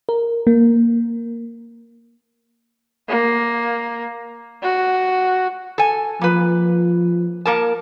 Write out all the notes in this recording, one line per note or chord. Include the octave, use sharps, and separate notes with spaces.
A#4
A#3
A#3
F#4
A4 G#5
F3 A#3 B4
A#3 A#4 A5